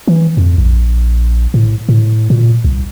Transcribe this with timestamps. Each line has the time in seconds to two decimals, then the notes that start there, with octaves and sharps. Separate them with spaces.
0.07 E3
0.37 F2
0.58 A#1
1.54 A2
1.89 A2
2.30 A#2
2.64 C2